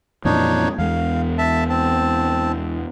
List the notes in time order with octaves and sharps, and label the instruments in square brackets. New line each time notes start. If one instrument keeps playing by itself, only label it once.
[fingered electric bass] F2 A#2 E3 [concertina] D4 D#4 C#5
[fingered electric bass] E2 G#3 [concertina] F5
[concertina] E5 A5
C4 A5